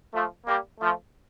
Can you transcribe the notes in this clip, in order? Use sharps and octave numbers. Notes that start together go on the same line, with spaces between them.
F3 A3
G3 A#3
F3 A3